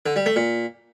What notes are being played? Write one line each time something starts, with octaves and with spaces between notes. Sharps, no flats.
D3
G3
A3
A#2